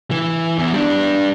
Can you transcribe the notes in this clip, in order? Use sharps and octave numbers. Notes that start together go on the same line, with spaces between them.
E3
E2 E3
G3 D4